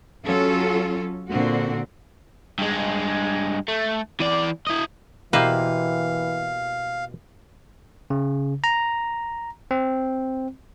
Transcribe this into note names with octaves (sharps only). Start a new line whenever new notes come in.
F#3 C#4 F4 A4
A#2 D3 C4 F#4
G2 G#3
A3
E3 D5
E4 D#5
B2 E3 A#3 E4 G4 B4 C5 F5
C#3
A#5
C4